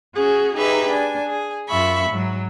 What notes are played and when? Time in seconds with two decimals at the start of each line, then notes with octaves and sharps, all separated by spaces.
0.15 C#4 F#4 G#4
0.56 D#4 G4 G#4 B4 E5
0.89 D4 G#5
1.26 G#4
1.68 F#2 F4 E5 B5 C#6
2.10 G#2 F#3